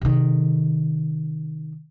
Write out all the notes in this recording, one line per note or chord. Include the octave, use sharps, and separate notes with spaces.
C3 D#3